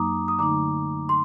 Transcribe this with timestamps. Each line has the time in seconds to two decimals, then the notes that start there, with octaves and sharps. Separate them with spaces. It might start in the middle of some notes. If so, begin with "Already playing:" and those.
Already playing: F#2 F#3 A#3 D#4 A#5 D6 D#6
0.28 D#6
0.39 D3 A3 D#4 A#5 D6
1.09 C6